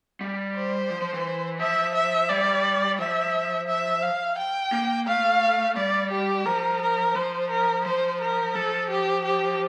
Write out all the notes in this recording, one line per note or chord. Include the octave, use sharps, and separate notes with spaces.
G3
C5
F3
F3
E3
F3 E5
E5
G3 D5
F3 E5
E5
F5
G5
A#3
A3 F5
G3 D5
G4
F3 A#4
A#4
F3 C5
A#4
F3 C5
A#4
F3 A4
G4
G4